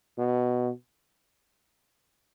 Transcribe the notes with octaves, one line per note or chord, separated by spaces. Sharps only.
B2